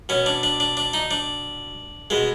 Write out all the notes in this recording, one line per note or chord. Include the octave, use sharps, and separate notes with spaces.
B2 C#4
D4
D4
D4
D4
D#4
D4
B2 G#3